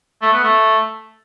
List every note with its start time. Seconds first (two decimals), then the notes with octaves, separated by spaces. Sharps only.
0.22 A3
0.33 B3
0.44 A3